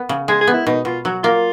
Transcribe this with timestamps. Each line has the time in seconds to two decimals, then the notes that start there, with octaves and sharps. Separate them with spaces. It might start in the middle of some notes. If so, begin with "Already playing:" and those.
Already playing: B3
0.09 C#3
0.28 G#3 G#4
0.41 G#4
0.47 B3
0.53 E4
0.66 B2 D#4
0.85 B2 F4
1.05 F#3 F#4
1.23 A#3 F4